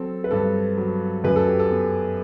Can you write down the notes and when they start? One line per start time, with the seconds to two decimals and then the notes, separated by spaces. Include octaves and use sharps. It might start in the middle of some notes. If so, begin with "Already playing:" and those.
Already playing: F#3 C4 A4
0.24 B4
0.31 G2 A4
0.78 F#3
1.24 F#2 B4
1.36 A4
1.47 G4
1.59 A4
1.71 B3